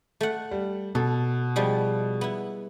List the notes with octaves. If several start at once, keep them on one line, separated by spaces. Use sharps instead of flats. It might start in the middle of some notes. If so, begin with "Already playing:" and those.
A3 F#5
G3
B2 A4
F3 G3 G#3
B3 E4